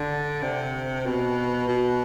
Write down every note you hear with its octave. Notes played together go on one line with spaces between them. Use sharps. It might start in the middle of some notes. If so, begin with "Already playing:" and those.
Already playing: D3
C3
B2
B2